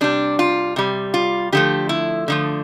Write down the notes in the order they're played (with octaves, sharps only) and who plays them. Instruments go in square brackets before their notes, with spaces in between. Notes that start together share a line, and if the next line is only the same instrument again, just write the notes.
[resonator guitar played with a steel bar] C3 G3 D4
F4
C3 G3
F4
D3 F3 A3 G4
E4
D3 F3 A3